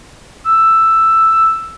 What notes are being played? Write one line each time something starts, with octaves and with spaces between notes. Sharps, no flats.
E6